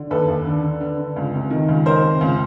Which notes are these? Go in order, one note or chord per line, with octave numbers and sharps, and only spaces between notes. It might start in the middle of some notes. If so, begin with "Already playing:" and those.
Already playing: D3
D#2 A4 B4
D#2
D3
D3
D3
D3
C#2
C3
D#3
C#2
D#3 A#4 C5
C3
C#2